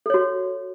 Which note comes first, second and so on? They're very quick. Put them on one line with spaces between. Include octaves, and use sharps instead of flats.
A4 C#5 F#4